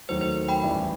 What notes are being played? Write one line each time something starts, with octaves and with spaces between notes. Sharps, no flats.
D#2 D#3 F#3 A3 C5
C5
G5 B5
A1 A2 G3